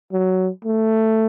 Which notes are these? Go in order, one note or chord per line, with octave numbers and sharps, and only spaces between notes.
F#3
A3